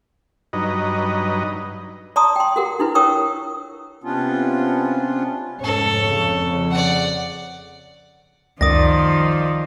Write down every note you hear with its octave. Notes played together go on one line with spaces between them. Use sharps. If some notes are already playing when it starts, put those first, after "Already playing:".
G2 F#3 D#4 B4 D#5
D5 A5 A#5 C6 D#6
G5 C6
F#4 G4 A4 A#4 F#5
D4 E4 F4 B4
A#4 C#5 G5 C#6 D#6 E6
C3 B3 C#4 D4 F4
F1 G#2 C#4 A4 C#5
F2 C#3
D5 F#5
C#2 F#2 D#3 F3 D5 D#6 A#6